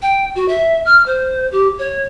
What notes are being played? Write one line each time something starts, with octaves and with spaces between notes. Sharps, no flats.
G5
F#4
E5
F6
C5
G4
C#5